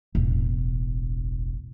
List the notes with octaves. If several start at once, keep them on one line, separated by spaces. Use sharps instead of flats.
E1 A1